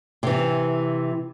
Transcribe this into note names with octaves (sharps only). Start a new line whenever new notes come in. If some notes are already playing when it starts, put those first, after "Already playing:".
C3 E3